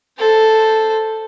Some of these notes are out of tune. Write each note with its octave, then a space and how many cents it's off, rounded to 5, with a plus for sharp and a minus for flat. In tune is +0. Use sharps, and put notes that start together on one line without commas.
A4 +0 C5 +0